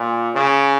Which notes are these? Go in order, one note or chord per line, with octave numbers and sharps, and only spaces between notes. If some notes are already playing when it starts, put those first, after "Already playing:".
Already playing: A#2
C#3